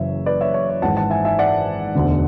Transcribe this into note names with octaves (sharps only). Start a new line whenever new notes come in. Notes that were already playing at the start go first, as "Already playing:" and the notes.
Already playing: F#1 F#2 C#3 E3 C#5 E5
B4 D5
C#5 E5
C#5
C#5
G#1 G#2 E3 F#5 A5
F#5 A5
E5 G#5
E5 G#5
D5 F#5
E1 D2 D3